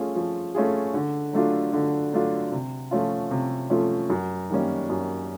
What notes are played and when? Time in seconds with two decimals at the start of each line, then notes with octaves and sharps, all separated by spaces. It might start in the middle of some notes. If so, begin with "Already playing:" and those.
Already playing: F3 A3 C#4 F4 G#4
0.16 F3
0.55 A3 C#4 F4 G#4
0.94 D3
1.33 F#3 A3 D4 F4
1.73 D3
2.13 F#3 A3 D4 F4
2.52 C3
2.91 F3 A3 C#4 F4
3.31 C3
3.70 F3 A3 C#4 F4
4.10 F#2
4.50 D#3 G3 A#3 C#4
4.89 F#2